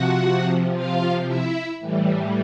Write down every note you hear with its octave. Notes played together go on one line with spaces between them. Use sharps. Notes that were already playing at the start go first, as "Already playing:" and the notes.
Already playing: C3 F3 F#4 F#5
F4 F5
E4 E5
A2 E3 G3